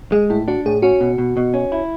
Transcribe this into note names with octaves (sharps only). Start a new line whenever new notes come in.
G#3 G#4
A2 E4
D4 F#4
A2 G#4
C#4 F#4
B2
B2
B2
C#4
E4